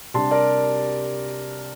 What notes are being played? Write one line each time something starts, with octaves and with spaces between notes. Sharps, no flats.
C3 G3 D4 A5 C6
A#4 D5